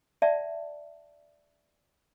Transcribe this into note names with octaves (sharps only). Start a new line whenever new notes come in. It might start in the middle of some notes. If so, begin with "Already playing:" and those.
D5 E5 F#5 A5